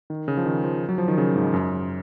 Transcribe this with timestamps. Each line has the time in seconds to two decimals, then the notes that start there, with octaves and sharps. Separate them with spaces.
0.10 D#3
0.28 C#3
0.37 F3
0.46 D#3
0.64 F3
0.89 F#3
0.98 F3
1.08 D#3
1.18 C#3
1.36 G#2
1.54 F#2